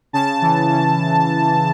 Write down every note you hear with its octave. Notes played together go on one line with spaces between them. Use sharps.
C#3 A5
E3
C#3